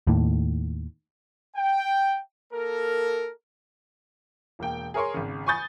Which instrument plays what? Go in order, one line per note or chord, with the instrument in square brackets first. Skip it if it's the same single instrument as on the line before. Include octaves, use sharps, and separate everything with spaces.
[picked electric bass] D#2 A2
[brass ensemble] G5
A#3 A4 A#4
[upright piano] E1 A#3 G5
G#4 A#4 C#5 C6
G#1 C#3
G#5 B5 C#6 D#6 G6 A6